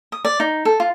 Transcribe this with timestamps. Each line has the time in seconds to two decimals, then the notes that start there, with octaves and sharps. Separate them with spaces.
0.12 D#6
0.25 D5
0.40 D#4
0.65 A4
0.80 F4